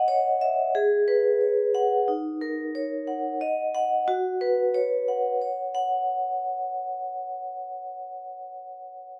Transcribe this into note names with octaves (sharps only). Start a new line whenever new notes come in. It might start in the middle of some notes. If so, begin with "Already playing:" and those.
Already playing: D#5 F#5
C#5
E5
G#4
B4
C#5
F#5
D#4
A#4
C#5
F#5
D#5
F#5
F#4
B4
C#5
F#5
C#5
F#5